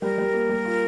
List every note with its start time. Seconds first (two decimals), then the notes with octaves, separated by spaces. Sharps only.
0.01 G3 A#4
0.18 G3
0.33 A#3
0.49 G3
0.65 F4